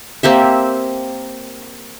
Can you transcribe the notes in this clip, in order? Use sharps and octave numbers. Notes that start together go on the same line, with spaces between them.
A#3 C4 G4 E5